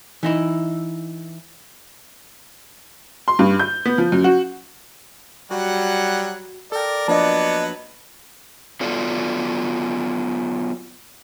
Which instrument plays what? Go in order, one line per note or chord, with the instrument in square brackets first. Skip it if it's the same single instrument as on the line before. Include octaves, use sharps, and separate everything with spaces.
[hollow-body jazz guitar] E3 D#4 E4
[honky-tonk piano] C6
G2
G6
B3
F3
F#2
F#4
[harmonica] F#3 F#5 [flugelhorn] G3 [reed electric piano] F#4
[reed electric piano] A4 G5 [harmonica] A#4 [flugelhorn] D5
[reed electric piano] F3 A#3 D4 [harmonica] F#3 B3 B4 [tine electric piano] D#5 A5
[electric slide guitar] F#3 B3 F4 A4 D5